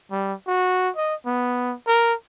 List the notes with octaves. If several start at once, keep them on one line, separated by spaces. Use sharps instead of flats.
G3
F#4
D#5
B3
A#4